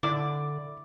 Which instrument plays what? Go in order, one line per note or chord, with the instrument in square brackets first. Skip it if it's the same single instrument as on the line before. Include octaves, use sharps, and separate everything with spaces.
[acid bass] D3 [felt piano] E4 D6 [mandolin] D5